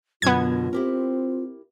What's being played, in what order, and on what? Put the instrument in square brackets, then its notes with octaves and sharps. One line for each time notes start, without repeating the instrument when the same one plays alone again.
[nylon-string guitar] F#2 B2 D3 [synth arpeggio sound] B3 G#6 [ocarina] F4
[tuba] C4 [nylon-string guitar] E4 G4 A#4